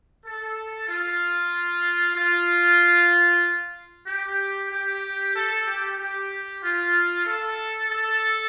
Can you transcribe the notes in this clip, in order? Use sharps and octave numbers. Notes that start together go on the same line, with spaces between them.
A4
F4
F4
G4
G4
A4
G4
G4
F4
A4
A4